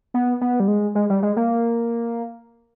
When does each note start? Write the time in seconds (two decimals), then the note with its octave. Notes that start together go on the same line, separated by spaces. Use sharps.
0.14 B3
0.41 B3
0.60 G3
0.68 G#3
0.95 G#3
1.10 G3
1.23 G#3
1.37 A#3